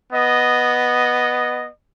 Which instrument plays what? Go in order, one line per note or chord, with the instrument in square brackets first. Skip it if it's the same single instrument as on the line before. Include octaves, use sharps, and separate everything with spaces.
[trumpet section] B3 D#5